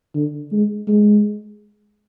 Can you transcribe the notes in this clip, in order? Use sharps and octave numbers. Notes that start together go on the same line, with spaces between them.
D3
G#3
G#3